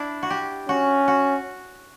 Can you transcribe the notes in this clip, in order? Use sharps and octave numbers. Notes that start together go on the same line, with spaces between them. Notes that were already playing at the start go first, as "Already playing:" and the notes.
Already playing: D4 E4
F#4
G4
C#4 F#4
F#4